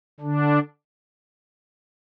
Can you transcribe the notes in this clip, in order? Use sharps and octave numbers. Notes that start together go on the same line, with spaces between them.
D3 D4